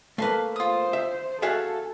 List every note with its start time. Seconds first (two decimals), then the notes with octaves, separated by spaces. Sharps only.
0.18 A3 A#3 B4 F5
0.56 F4 C5 D#6
0.93 E5
1.42 F#4 G#4 A4 E5 F5 A5